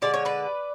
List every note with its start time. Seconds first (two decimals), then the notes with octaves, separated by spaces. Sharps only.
0.02 D3 G#3 D5
0.14 C#5
0.25 B4 D5